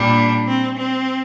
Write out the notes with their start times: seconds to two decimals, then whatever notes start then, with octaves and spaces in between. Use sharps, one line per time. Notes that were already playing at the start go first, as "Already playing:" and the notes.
Already playing: A#2 G3 D4
0.48 C4
0.78 C4